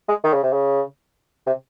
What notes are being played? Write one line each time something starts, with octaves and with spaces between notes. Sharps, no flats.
G#3
D#3
C#3
C3
C#3
C3